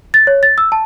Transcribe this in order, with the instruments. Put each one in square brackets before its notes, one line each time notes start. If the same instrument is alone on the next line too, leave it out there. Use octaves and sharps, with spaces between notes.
[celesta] A6
C#5
A6
E6
A5